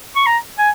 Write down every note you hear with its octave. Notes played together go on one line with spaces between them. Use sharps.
C#6
A#5
G#5